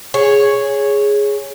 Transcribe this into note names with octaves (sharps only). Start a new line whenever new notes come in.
G#4 C#5